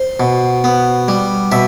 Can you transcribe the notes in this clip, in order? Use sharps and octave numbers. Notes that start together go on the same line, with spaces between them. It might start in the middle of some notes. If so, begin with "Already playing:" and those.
Already playing: C5
B2
B3
G3
B2 E5